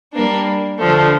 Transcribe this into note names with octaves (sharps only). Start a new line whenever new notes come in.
G3 A#3 D4
D3 F3 A3